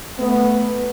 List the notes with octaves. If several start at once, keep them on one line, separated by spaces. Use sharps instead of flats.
A3 B3